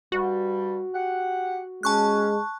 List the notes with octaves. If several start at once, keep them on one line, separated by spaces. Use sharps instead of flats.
G2 G3 F#4
G4 F#5
G#3 C#4 A5 C#6 F#6